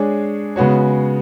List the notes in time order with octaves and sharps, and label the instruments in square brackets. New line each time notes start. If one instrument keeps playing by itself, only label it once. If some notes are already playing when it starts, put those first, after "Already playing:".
Already playing: [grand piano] G#3 D4 G#4 C#5
C#3 G#3 B3 F#4 C#5